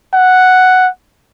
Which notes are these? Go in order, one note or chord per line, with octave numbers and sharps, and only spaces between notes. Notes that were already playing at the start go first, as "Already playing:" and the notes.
F#5